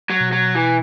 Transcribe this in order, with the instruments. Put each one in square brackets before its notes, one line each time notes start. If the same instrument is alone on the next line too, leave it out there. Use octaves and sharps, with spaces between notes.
[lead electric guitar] F#3
[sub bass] B2
[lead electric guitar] F#3
E3